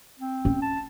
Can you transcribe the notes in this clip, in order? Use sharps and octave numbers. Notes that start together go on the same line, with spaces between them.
C4
C#4
A5